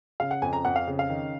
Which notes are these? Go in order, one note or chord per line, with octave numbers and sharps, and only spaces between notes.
C#3 F5
F#5
F2 G#5
A#5
F2 F#5
F5
C#3
F5
D#3